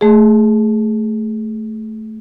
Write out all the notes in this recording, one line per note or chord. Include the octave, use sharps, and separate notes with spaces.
A3 G#4